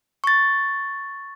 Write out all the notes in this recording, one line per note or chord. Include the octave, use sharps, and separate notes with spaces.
C#6 A6